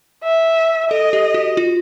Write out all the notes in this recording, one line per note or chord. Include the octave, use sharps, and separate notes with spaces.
E5
A4 D#5
G4
F#4
F4